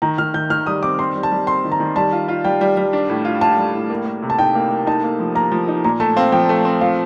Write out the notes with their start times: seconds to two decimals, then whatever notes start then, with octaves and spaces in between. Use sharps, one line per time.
0.02 D#3 A#5
0.18 D#3 F6
0.34 D#3 G6
0.50 D#3 F6
0.66 G3 D#6
0.83 C4 D6
0.98 C4 C6
1.16 G3
1.23 A5
1.32 G3
1.47 C4 C6
1.64 D#3
1.72 A#5
1.80 D#3
1.95 G3 A5
2.12 F4
2.28 F4
2.44 G3 G5
2.61 G3
2.77 G3
2.93 D4
3.09 A2
3.25 F4
3.41 F4 A5
3.58 G3
3.74 A2
3.90 A#3
4.06 A#3
4.23 C3
4.30 A5
4.39 D#4 G5
4.55 A#3
4.71 A#3
4.87 D#4 A5
5.04 A#3
5.20 F3
5.35 A#3 A#5
5.52 F3
5.68 D#4
5.84 A#2 A#5
6.00 A3 A5
6.16 C4 F5
6.32 F3 G5
6.49 A3
6.65 C4
6.81 F3 F5